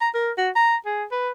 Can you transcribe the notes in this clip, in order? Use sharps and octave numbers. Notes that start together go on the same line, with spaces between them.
A#5
A#4
F#4
A#5
G#4
B4